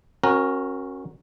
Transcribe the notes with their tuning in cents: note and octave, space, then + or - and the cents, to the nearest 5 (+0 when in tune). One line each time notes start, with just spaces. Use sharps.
C#4 -35 F#4 +0 A#4 +0